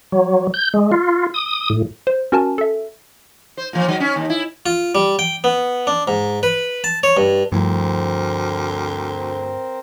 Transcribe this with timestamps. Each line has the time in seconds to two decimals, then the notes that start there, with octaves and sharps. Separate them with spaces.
0.12 F#3
0.54 G6
0.74 G#3
0.92 F4
1.34 D#6
1.70 A2
2.07 C5
2.32 C#4 F#4 A#4 G#5 A5
2.58 A4 E5
3.57 C5
3.73 A#2 F3
3.88 D#3 F#3
4.00 C#4
4.16 D#2
4.30 E4
4.66 F4
4.95 G3
5.19 G5
5.44 B3
5.87 D4
6.08 G#2
6.43 B4
6.84 A5
7.03 C#5
7.17 G2
7.52 D2 G2 F3 A3 C4 E4 A#4 C5